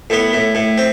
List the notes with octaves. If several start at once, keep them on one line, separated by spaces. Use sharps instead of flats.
A2 B3
A2
A2
C4